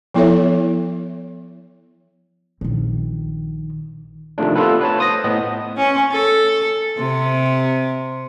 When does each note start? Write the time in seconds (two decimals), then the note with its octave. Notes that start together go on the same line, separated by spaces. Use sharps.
0.14 F3 B3 E4 A4 C#5 E5
2.61 A#1 D#3
4.38 C3 D#3 F3 A3 D4
4.56 A3 B3 F4 A4 B4
4.81 B4 C#5 A5
4.98 C5 D#6 A#6
5.24 A2 B3 D#5
5.77 C#4
6.12 A4
6.98 C3